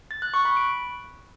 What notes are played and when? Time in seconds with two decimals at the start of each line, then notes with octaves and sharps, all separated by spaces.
0.11 A6
0.22 F#6
0.34 C#6
0.45 B5
0.57 D7